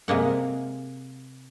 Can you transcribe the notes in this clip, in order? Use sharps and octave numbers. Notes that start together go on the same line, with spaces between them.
C3 G#3 A#3 F#5